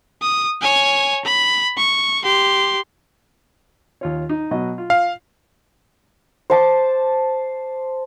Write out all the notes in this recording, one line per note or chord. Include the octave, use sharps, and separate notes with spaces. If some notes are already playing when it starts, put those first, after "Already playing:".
D#6
C#5 G#5
B5
C#6
G4 C6
D#2 F4 C#5
D#4
B2 F#3 D#5
F4
F5
C5 A5 D6